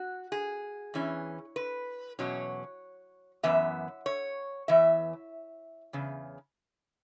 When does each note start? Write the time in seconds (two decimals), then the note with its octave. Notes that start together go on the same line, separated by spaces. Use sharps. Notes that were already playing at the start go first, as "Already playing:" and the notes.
Already playing: F#4
0.32 G#4
0.94 E2 E3 C#4
1.56 B4
2.19 E2 B2 F#3 C#4 C#5
3.43 F#2 E3 B3 E5
4.06 C#5
4.68 E2 E3 E5
5.93 E2 C#3